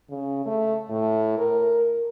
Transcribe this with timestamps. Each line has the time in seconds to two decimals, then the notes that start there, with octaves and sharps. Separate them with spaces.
0.10 C#3
0.45 A3
0.90 A2
1.38 A#4